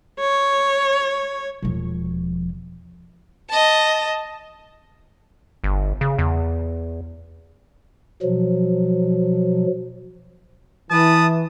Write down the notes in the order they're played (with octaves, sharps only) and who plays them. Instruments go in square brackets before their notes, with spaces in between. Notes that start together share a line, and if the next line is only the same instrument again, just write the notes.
[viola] C#5
[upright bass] E1 F3
[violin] D#5 A5
[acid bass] G1
C#3
E2
[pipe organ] B2 F3 F#3
[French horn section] E3 [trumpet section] B4 A5 D#6